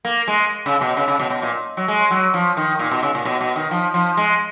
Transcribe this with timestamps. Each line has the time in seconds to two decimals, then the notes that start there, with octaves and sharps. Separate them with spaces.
0.05 A#3
0.28 G#3
0.66 C#3
0.81 B2
0.97 C#3
1.08 C#3
1.20 B2
1.30 B2
1.42 A#2
1.77 F#3
1.88 G#3
2.11 F#3
2.34 F3
2.57 D#3
2.79 A#2
2.91 B2
3.03 C#3
3.15 A#2
3.25 B2
3.41 B2
3.56 D#3
3.71 F3
3.94 F3
4.17 G#3